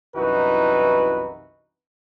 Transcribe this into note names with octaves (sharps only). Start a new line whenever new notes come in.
C2 F#2 E3 D#4 F#4 B4